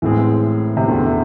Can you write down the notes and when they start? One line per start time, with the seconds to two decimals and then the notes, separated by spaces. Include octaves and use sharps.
0.02 A1 A2 E3 G#3 C4 G#4
0.77 C3
0.88 E2 B2 D3 B3